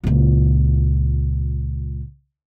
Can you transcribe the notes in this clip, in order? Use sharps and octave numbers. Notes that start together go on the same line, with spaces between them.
C#2 A#2